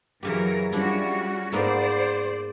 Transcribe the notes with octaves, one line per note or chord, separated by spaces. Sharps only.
F#2 C#3 E3 F#3 G4 A#4
F3 G3 C#4 D4 E4 F#4
G#2 A#3 B3 C5 D5